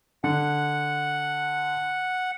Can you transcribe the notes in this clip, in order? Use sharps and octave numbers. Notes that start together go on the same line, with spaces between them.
D3 F#5